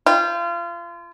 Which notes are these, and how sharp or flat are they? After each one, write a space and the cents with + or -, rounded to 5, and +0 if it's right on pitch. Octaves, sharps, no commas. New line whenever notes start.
F4 -30 G5 +0